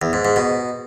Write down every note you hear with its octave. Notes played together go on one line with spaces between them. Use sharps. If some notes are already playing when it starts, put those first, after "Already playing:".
E2
G#2
G#2
B2